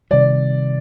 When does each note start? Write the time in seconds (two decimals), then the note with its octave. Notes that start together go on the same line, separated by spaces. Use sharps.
0.11 C3 D#3 G3 D5